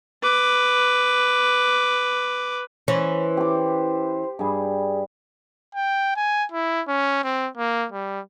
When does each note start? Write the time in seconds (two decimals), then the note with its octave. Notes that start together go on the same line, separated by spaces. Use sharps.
0.23 B4 D6
2.88 E3 C#4 C5
3.37 G4 D6
4.39 G2 G3 G#4
5.75 G5
6.16 G#5
6.52 E4
6.88 C#4
7.24 C4
7.57 A#3
7.92 G3